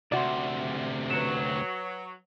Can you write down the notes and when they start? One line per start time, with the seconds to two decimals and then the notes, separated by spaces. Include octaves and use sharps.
0.12 D2 C3 F#4 D5 E5 C6
1.10 F#3 B4 C#7 E7